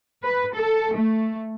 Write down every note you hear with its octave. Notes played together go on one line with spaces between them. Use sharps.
B4
A4
A3